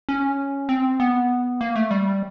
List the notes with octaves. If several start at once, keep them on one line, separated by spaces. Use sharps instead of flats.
C#4
C4
B3
A#3
A3
G3